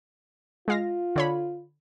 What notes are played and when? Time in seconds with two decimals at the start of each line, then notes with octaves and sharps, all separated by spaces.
0.68 G#3 F4 F5 A#6
1.16 D3 C#5 B5